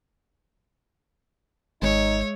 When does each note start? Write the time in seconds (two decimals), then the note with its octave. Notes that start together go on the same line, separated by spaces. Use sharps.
1.82 G#1 G#3 D#4 C#5 E5